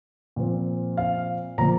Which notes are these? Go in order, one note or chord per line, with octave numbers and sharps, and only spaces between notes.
A#2 F3 C4
F5
A#2 F3 A#3 A#5